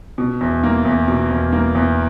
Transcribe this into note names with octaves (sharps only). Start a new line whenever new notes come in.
B2
E2
A#3
E2
B2
E2
A#3
E2